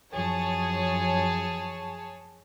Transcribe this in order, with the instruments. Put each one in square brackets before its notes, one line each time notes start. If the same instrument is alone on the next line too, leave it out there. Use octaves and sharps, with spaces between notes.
[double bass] F#2 F3 [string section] G#4 C#5 A5